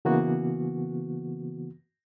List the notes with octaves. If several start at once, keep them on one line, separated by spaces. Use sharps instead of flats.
C#3 E3 A#3 B3 F#4